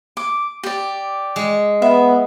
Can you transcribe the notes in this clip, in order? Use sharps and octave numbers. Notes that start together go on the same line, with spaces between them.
D6
G4 D5
G#3
B3 E5